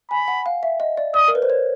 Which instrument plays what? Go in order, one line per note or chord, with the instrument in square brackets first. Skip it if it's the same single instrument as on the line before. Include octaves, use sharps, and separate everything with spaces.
[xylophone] G#5 [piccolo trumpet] B5
[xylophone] F#5
F5
E5
D#5
D5
[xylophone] D5 [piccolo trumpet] D#6
[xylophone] A#4
B4
C5
C#5